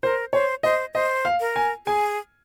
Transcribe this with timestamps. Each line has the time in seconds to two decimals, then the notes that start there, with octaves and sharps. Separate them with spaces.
0.03 A#4 C5
0.33 C5 C#5
0.63 C5 D#5
0.94 C5 D#5
1.25 F5
1.40 A#4
1.56 G#5
1.86 G#4 G#5